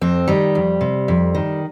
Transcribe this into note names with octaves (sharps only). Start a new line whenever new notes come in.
F2 C4
D#3 G3
F2
C3
F2
D#3